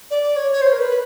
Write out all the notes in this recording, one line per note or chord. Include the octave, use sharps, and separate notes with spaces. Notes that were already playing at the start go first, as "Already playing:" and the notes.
D5
C#5
C#5
C5
A#4
B4